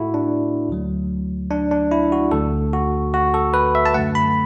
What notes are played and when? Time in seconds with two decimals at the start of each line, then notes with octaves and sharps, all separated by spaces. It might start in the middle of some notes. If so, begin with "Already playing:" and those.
Already playing: A2 A3 E4 F#4 A4
0.14 D4
0.69 D2 D3 F#3 A3
1.51 D4
1.71 D4
1.91 E4
2.12 F#4
2.32 D2 D3 A3 A4
2.73 F#4
3.14 F#4
3.34 A4
3.54 B4
3.75 E5
3.86 A5
3.94 F#2 D3 A3 F#5
4.15 B5